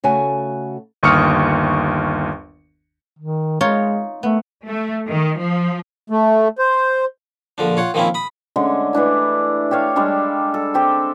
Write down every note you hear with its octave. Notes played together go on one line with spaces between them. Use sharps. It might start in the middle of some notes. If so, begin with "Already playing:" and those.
C#3 A3 F#4 G#5
G1 D#2 C#6 D#6 F6 C#7
D#3
G#3 D#4 F4 C#5
A3 B3
A3
D#3
F3
A3
C5
A#1 D3 F3 D4
F4 C#5 F#5
D#3 F3 A#3 C4 C#4 E4
B5 D#6
D3 G#3 A3 C#4
E3 A3 D4 E4
G4 A4 C#5 F5
G3 G#3 D4 A4
A4
C4 G4 A4